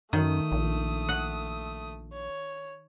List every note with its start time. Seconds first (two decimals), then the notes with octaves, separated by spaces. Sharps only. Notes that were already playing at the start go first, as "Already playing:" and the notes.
0.13 F#2 D#3 A3 D#6
0.52 A#1
1.09 F#5
2.14 C#5